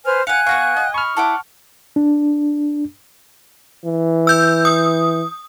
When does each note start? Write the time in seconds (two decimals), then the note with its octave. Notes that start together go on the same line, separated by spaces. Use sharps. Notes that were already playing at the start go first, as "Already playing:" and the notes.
0.05 B4 C5 G#5 F6
0.27 F5 F#5 G#5 F#6 C#7
0.47 B3 F#4 F5 F#5 C#6
0.77 D#5
0.94 B5 C#6 F6
1.17 E4 A4 F#5 D6
1.96 D4
3.85 E3
4.27 E6 G6
4.65 D#6